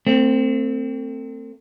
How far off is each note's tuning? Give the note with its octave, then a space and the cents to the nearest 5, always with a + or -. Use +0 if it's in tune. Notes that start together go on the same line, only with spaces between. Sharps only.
A3 +40 C4 +0